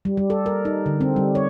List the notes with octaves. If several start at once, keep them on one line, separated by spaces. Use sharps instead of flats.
G3
G3
A4
A#4
D#4
D3
C4
G3
C#5